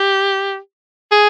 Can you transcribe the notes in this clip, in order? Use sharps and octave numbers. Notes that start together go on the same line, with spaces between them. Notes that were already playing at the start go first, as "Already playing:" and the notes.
Already playing: G4
G#4